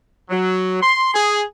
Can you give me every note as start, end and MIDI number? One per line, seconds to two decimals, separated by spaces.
0.29 0.80 54
0.81 1.11 84
1.14 1.42 68